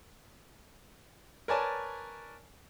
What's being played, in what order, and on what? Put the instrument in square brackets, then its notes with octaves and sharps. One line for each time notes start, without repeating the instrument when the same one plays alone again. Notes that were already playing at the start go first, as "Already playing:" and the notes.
[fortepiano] A#4 B4 C#5 D5 G#5 A5